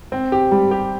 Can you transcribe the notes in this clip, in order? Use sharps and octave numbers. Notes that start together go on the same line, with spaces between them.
C4
G4
G3
G4